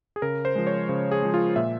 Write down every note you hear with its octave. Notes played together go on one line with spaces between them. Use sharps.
G#4
C#3 A#4
C5
F3 G#3
C#5
C#3 C5
G#4
F3 G#3
F4
A#2 E5